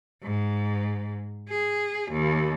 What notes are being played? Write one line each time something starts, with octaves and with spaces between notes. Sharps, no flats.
G#2
G#4
D#2